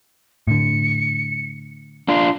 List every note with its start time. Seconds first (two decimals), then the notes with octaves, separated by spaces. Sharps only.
0.47 A2 D3 C#7
2.08 D4 F4 C6